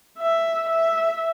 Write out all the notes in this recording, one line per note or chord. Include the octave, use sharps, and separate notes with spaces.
E5
E5